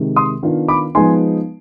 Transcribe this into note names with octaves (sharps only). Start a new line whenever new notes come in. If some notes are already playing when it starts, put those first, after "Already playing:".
Already playing: C3 D#3 G#3
C6 D#6
D#3 B3 D4 F4
B5 D6
F3 G#3 B3 D#4 G#5 C6